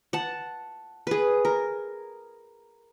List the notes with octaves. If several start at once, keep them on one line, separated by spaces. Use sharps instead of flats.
F#5 A5
G#4 B4
A#4